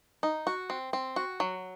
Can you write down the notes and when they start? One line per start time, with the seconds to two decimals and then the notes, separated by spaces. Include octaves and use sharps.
0.23 D#4
0.47 F#4
0.70 C4
0.93 C4
1.16 F#4
1.40 F#3